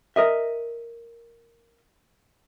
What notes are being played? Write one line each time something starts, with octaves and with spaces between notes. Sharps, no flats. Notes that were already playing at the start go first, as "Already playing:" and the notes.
A#4 D#5 E5